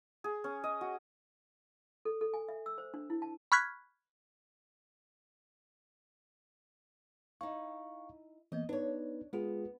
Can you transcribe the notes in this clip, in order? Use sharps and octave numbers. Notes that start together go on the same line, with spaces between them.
G#4
C#4
D#5
F#4
A4
A4
G#5
E5
E6
C5
D4
E4
A5
B5 C#6 F6 F#6 G#6 B6
D#4 E4 F5 C#6
E3 A#3 B3 D#5
B3 D4 D#4 B4 C#5
G#3 B3 F4 G#4